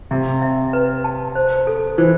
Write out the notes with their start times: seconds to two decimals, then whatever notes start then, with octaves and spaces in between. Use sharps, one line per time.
0.11 C3 E5
0.42 E5
0.73 B4
1.04 A5
1.35 C5
1.67 A4
1.98 E3 C5